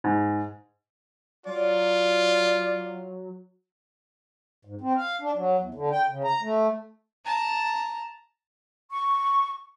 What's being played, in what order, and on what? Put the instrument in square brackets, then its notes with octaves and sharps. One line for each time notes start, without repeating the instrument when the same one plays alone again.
[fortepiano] G#2
[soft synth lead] F#3 [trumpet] F4 [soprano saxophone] D5
[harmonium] G#2
C4
F5
D4
F#3
E2
D3
G5
C#3
A#5
A3
[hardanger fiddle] A5 A#5
[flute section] C#6